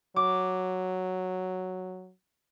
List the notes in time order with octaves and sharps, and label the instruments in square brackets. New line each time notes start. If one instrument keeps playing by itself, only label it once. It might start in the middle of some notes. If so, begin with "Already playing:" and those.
[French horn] F#3 [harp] D6